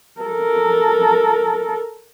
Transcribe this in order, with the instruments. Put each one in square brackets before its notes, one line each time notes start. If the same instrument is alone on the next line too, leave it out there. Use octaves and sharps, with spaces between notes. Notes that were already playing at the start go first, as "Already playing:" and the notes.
[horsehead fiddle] A4 A#4